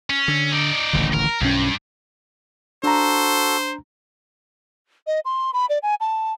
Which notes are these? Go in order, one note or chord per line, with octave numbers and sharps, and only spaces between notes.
C#4
D3
D#4 D5
D#1 A1 D3
A#4
B1 G2 E3 C#4
D4 F#4 A4 C5 A#5
D#5
C6
B5
D5
G#5
A5